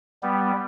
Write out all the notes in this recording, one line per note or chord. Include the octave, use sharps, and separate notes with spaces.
G3 B3